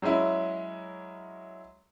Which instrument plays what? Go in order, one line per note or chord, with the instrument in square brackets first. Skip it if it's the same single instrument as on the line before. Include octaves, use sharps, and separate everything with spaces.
[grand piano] F#3 G#3 C#4 E4